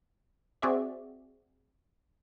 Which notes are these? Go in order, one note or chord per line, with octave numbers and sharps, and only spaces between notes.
C4 F#4 G#4 D5 E5